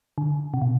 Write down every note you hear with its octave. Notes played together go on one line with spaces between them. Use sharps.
D3
C3
B2